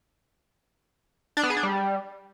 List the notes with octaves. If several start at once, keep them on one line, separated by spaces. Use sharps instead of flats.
D4
B3
G#4
D4
G3